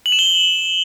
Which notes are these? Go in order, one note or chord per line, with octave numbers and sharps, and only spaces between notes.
F#7
E7
G7